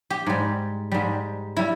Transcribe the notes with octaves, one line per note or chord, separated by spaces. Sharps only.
G4
G#2 G3
G#2 G3
G3 E4